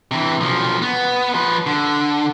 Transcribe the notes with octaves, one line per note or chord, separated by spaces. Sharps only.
C3 E3
B1 F3
B3
F3 B4
D3